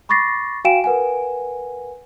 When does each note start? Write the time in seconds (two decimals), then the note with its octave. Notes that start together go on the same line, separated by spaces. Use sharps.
0.09 B5 C#6 D6 A6 A#6 C7
0.65 F#4 F5 G5 G#5 D7 E7
0.84 A#4 B4 F#5 G#5